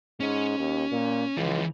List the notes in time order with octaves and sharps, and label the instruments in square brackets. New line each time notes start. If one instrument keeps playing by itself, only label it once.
[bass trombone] G#2 [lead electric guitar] C#4
[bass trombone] D#2
A#2
[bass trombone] C#2 [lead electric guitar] E3 F3